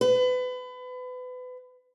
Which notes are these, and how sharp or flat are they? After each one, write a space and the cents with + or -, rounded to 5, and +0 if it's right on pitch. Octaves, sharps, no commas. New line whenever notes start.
B4 +30